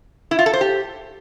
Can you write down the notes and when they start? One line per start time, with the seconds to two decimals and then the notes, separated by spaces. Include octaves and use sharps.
0.31 E4
0.39 F4
0.46 A4
0.53 C5
0.61 G4